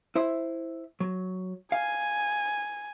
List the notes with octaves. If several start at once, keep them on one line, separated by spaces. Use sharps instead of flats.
E4 C5 E5
F#3
F5 G#5